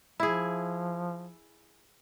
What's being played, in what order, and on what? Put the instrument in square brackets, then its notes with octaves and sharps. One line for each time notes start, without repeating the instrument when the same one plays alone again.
[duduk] F3 [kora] E4 G#4